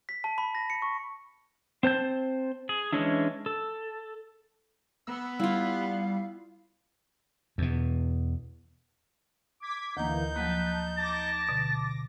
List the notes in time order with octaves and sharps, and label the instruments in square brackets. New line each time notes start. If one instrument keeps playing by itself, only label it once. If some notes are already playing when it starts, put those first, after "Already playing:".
[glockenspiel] B6
A5
B5
A#6
C#7
C#6
[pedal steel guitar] C4 C5 A5 G6
G#4
E3 G#3 C#4 D4 E4
A4
[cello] B3 [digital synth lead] E6
[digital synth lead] G3 [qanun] E4 F4 [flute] F5
[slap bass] E2 B2
[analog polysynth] D6 G#6 B6
[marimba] D2 A#5 [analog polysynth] D3 E3 A#3 [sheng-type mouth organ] D#4 G6
[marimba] F3 F#3 A#3 [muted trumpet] B4 [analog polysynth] A5
[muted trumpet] A5 [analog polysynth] D6 A#6
[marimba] B2 D3